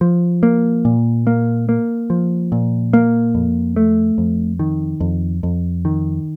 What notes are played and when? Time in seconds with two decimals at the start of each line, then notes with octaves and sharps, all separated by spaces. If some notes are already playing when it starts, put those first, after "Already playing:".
0.01 F3
0.43 A#3
0.85 A#2
1.27 A#3
1.69 A#3
2.10 F3
2.52 A#2
2.93 A#3
3.35 F2
3.76 A3
4.18 F2
4.59 D#3
5.00 F2
5.43 F2
5.85 D#3